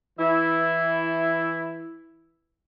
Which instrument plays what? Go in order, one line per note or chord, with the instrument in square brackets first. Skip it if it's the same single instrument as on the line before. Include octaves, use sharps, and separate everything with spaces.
[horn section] E3 E4